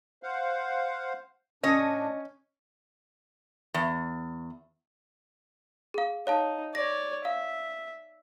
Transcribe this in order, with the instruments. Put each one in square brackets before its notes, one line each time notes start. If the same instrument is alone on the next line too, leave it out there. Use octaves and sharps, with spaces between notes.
[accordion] C5 F5 F#5
[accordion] A2 D4 [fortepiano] C#4 [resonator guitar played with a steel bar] C#5 D#5
[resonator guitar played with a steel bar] E2
[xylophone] G#4 F5
[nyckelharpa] D#4 [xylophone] C#5 F5 A5
[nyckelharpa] C#5 D5 [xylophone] A#6
[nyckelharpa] E5 [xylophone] F5